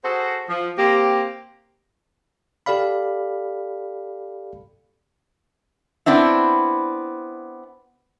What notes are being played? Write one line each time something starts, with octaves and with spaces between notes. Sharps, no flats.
F#4 G#4 A4 C5
F3
A#3 C4 G4
G4 A4 D5 F5 B5
B3 C4 D4 E4